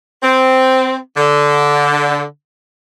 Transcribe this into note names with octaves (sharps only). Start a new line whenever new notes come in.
C4
D3